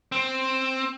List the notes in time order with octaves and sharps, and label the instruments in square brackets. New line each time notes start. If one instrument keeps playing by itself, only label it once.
[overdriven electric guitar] C4